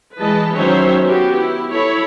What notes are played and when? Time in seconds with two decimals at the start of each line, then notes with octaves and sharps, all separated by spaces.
0.17 E3 G#3 B4 D#5 A5
0.53 D#3 F#3 C#4 C5 C#5 E5
1.04 B3 F#4 G4
1.37 E4
1.72 E4 A4 C#5 B5